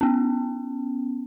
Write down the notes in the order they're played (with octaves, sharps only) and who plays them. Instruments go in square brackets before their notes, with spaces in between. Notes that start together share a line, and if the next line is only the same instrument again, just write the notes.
[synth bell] B3 C#4